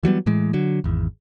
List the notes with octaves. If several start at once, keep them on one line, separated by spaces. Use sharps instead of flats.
E3 F#3 G3 B3
A2 E3 G#3
D3 F#3
G#1 E2